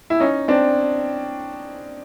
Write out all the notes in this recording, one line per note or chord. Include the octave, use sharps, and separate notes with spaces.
E4
C#4 D#4
C4 D4